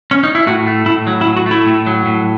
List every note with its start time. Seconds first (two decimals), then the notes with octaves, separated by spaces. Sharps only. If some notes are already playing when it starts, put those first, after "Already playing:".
0.11 C#4
0.23 D#4
0.35 E4
0.46 A2 F#4
0.67 A3
0.86 A2 E4
1.07 F#3
1.21 E4
1.26 A2
1.37 F#4
1.46 A3
1.51 E4
1.66 A2
1.86 F#3
2.06 A2